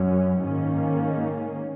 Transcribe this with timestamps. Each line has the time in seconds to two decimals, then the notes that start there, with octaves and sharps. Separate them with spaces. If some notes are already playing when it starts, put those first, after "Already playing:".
Already playing: F#2 F#3 C#4
0.40 G#2 D#3 A#3 C#4